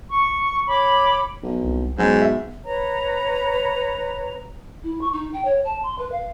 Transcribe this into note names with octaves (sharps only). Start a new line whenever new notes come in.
C#6
C#5 B5 D6
B1
C2
G#2 B2 F#3 C#4
E5
B4 C#5 A#5
E4
C#6
D#4
G5
C#5
A5
C6
B4
F5